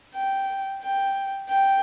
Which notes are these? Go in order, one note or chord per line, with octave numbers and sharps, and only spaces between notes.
G5
G5
G5